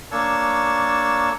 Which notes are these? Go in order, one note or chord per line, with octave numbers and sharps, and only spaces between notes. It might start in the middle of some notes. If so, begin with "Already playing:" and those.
A#3 D4 C#5 A5 C#6 E6